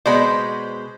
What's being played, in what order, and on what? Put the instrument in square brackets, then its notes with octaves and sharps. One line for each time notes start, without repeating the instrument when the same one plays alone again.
[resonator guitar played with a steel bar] B2 G#3 [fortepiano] B3 D5 [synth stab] C5 B5